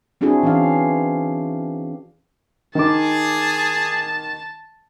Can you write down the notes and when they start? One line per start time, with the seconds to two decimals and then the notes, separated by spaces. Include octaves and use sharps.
0.21 C4 D4 E4 F#4 G#4
0.43 E3 C#4 F5
2.75 D#3 G#4 A5 D6